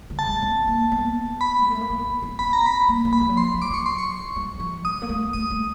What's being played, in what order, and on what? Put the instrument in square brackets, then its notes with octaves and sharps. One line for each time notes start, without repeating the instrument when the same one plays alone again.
[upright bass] D3
[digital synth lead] A5
[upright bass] G#3
C4
A#3
B3
[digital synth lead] B5
[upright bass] G#3
A3
A#3
B3
B3
[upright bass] C4 [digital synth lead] B5
[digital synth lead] A#5
B5
[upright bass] A#3
A#3
[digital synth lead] B5
[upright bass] F3
F#3
[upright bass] F3 [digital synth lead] C6
[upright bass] F#3
[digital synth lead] D6
[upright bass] F#3 [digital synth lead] C#6
[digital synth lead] C6
C#6
[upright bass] F#3
F3
[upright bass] F#3 [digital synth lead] D#6
[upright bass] A#3
A3
[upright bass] A3 [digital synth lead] D#6
[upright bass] A3